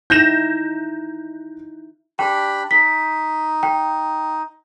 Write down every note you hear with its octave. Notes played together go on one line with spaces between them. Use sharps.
D#4 E4 G6 A#6 E7
D4 G4 G5 B5
D#4 B6
G5